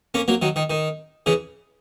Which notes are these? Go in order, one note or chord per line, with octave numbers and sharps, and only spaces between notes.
A#3 C#4
F#3 A#3
D#3 F#3
D#3
D#3
C#3 E3